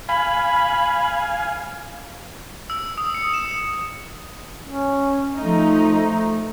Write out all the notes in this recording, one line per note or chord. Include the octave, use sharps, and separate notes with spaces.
F5 G#5 B5
E6
D#6
C#7
E7
C#4
F3 A3 D#4
A3